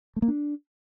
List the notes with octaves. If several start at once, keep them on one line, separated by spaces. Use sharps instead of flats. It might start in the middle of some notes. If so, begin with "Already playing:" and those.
A3
A#3
D4